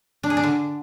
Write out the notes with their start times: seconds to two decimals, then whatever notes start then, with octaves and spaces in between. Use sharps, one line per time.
0.23 D4
0.30 G#4
0.37 D4
0.43 D3